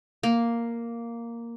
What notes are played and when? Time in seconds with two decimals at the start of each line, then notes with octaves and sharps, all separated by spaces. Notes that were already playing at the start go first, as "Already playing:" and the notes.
0.23 A#3